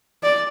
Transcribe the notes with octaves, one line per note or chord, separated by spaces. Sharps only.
D5